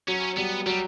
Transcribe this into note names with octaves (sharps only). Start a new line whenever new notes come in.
F#3 C#4
G3 B3
F#3 G3